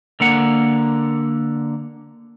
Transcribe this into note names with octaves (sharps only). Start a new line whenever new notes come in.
D3 A#3 F#5